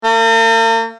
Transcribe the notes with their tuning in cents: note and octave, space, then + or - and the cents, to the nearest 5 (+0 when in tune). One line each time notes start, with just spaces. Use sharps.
A#3 -45